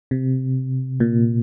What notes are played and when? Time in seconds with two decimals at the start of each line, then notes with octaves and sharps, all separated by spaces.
0.11 C3
1.00 A#2